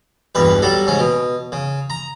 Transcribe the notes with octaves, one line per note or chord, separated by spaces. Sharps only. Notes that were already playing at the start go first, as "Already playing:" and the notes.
B1 E2 G2 B4
F#3 G3 A4
G#2 C#3 C#4
B2
C#3
A#5